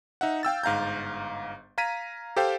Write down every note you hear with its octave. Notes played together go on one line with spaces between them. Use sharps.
D#4 E5 F#5
F5 G5 E6 A6
G1 G#2 F5 A#5 G6
F5 A#5 G#6 B6 D#7
G4 A4 C5 F5 G5